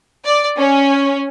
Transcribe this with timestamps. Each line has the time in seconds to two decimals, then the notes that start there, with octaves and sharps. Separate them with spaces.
0.25 D5
0.59 C#4